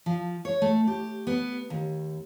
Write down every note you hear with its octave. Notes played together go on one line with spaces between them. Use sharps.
F3
C#5
A3
G4
B3
D#2